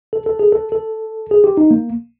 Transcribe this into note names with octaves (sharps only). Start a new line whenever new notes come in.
A4
A4
G#4
A4
A4
G#4
G4
D#4
A#3